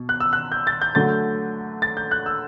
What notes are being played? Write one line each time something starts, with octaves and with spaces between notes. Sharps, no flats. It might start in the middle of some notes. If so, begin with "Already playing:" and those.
Already playing: B2
F#6
E6
F#6
G6
A6
G6
D3 F#3 A3 A6
A6
G6
F#6
E6